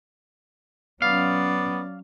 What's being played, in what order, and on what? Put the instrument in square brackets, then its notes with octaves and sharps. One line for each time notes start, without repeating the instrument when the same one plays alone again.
[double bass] F#3 C#4 [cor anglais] B3 [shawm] D5 [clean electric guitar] F5